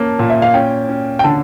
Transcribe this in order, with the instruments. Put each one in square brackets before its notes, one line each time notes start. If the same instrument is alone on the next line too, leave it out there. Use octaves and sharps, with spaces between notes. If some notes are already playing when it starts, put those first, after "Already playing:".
Already playing: [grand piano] A#3 C#4 [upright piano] A5
[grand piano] A#2
[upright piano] E5
F5
[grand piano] C#4 [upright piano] G5
[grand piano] C#4
[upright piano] G5
[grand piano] D3 [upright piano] A5